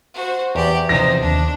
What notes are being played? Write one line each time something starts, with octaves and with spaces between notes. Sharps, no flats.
F#4 C5
E2 G4 D5
C3 E3 F3 D#4 C5 A#6
D#2 D4